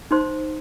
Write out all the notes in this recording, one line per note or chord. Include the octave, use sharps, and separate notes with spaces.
D#4 C5 C6